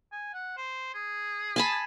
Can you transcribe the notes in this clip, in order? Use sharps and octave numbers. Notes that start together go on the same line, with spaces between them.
G#5
F#5
C5
G#4
G#5 A5 B5